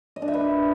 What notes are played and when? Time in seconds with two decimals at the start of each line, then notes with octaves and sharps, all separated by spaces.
0.16 D#5
0.22 D4
0.28 E5
0.34 B4